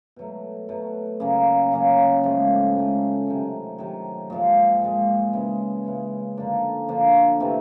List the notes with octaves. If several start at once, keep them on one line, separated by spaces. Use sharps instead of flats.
B2 F#3 A3
B2 F#3 A3
C#3 F#3 A#3 C#4
C#3 F#3 A#3 C#4
G#2 F3 A3
G#2 F3 A3
C3 D#3 F#3
C3 D#3 F#3
A#2 F3 G#3
A#2 F3 G#3
C#3 E3 G#3
C#3 E3 G#3
D3 F3 A#3 D4
D3 F3 A#3 D4
C3 E3 A3 C4